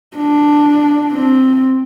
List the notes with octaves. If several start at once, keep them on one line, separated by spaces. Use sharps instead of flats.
D4
C4